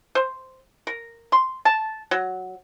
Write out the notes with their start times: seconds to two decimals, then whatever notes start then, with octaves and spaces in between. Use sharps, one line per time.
0.15 C5
0.87 A#4
1.32 C6
1.65 A5
2.11 F#3